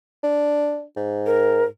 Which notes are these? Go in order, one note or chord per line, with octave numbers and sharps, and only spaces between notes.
D4
G#2
A#4